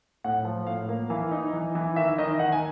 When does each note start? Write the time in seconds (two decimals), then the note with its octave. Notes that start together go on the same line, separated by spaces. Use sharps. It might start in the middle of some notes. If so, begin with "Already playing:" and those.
0.24 A2 F#5
0.45 F3
0.67 A2 F5
0.89 A#3
1.10 E3 F5
1.31 D#4
1.53 E3
1.75 E3
1.96 D#3 E5
2.18 D#3 D#5
2.39 D#3 F#5
2.52 G#5